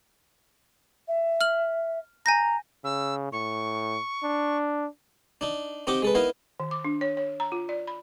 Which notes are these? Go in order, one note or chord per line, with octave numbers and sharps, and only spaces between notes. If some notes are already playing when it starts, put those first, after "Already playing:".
E5
F6 F#7
G#5 A#5 G6 A#6
C#3 E6
A2 C#6
D4
D4 D#4
C4 D#4 G4 D#5 F#5 D6
G#3 A4 B4
B3 D#4 E4 A#4 F5
D#3
D6
D4
C#5
C#5
A#5
F4
D5
B5